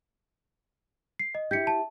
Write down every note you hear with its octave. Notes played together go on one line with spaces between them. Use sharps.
C7
D#5
E4 G4 G6 B6 C#7
A5